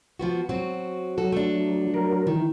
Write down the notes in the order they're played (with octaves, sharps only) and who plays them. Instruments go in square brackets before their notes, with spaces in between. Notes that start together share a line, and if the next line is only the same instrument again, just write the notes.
[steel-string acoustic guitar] F3 B3 F#4
F#3 C4 F#4
[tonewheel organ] F#3 [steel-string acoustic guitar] F#4 A4
[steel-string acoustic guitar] A3 D4
[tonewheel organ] F#3 A#4
[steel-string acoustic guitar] D#3 [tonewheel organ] E3